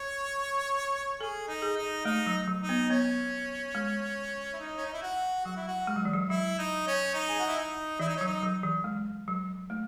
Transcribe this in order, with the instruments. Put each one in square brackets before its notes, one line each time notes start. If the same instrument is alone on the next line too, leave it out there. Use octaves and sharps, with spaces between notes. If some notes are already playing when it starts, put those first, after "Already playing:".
Already playing: [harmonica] C#5
[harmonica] G#4 [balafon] A4
[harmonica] D#4
[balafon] G#4
[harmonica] D#4
[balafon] A3 [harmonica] D#4
[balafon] F#3
F#3
[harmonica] D#4
[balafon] B3
[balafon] B3 [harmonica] C#4
[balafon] G#3
[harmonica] E4
D#4
C#4
D#4
E4
F#4
[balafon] F#3 [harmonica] F#4
[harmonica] E4
F#4
[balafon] G#3
F#3
E3
F#3
[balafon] F#3 [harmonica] E4
[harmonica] D#4
C#4
D#4
G#4
F#4
E4
D#4
[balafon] E3 [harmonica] E4
[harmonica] D#4
C#4
[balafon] F#3
[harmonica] D#4
[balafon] F#3
E3
G#3
F#3
A3